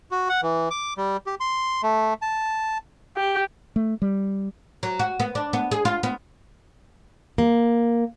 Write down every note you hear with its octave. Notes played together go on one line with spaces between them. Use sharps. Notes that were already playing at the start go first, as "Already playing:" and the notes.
F#4
F#5
E3
D6
G3
G4
C6
A3
A5
G4
A3
G3
F#3
F#4
B3
D4
B3
G#4
F4
B3
A#3